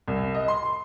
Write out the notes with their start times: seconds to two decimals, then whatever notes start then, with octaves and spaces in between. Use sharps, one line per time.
0.08 C2
0.34 D#5
0.48 C6
0.63 C6